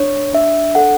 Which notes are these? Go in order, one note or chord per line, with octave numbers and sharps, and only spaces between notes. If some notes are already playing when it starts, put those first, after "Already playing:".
Already playing: D4 C#5
D4 E5
A4 F#5